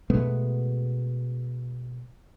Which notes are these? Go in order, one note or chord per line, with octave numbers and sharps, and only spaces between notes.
B2 G#3 A3 B3